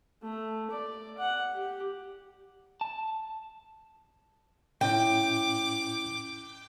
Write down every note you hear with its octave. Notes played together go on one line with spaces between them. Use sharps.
A3
D5
F#5
G4
A5
A2 C#4 E4 G5 D6